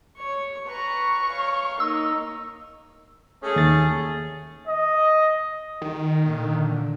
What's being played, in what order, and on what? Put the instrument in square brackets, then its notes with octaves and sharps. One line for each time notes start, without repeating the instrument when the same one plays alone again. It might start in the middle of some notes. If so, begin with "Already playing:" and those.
[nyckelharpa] C#5 C#6
[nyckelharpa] B4 A#5 [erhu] C#6
[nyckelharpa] C#5 F5
[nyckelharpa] A#3 D#4 [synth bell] E6
[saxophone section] A3 C#4 G#4
[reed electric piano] D#2 A6
[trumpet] D#5
[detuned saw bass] D#3
[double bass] A#2 D3